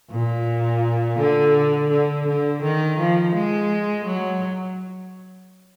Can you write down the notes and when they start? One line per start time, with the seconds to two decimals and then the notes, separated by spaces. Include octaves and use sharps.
0.11 A#2
1.19 D3
1.90 D3
2.27 D3
2.62 D#3
2.98 F3
3.34 G#3
4.05 F#3